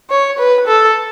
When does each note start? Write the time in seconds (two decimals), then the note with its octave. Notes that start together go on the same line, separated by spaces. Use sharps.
0.10 C#5
0.39 B4
0.67 A4